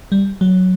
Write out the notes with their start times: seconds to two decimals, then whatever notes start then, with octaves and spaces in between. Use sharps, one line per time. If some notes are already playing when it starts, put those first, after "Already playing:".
0.12 G3
0.41 F#3